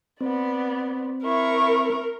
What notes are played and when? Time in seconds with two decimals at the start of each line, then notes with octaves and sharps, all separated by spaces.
0.21 B3 C4 D5
1.25 E4 A#4 C#6